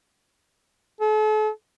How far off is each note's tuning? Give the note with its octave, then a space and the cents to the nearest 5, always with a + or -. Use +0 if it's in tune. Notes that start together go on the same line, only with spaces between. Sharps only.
A4 -40